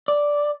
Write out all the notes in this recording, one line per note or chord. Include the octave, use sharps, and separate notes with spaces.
D5